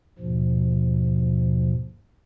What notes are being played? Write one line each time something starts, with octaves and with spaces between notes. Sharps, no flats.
D#2 G#2 B2 F3